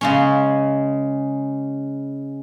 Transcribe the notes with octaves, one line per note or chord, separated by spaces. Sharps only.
C#3 G#3 C#4